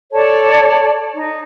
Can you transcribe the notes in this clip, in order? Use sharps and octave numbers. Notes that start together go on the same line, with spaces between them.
A4 C#5 D5 A5
D#4